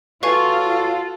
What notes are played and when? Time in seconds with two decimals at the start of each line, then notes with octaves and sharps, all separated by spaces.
0.23 F4 F#4 A4 B4 C#5 F5 G#5